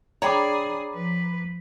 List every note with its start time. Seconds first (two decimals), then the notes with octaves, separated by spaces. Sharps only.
0.22 D4 G#4 C#5 D5 G5 A#5 B5 D6
0.92 F3 B4